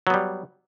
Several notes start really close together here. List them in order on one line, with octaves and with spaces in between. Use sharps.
F#3 B3 G3